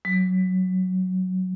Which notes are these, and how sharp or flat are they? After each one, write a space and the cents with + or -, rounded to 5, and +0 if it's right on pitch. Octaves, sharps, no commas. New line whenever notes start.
F#3 +0